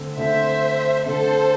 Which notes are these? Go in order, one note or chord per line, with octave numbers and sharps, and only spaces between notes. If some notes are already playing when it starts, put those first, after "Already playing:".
Already playing: D3 A3 C4
D3 A3 C4 C5 E5
D3 A3 C4 A4 C5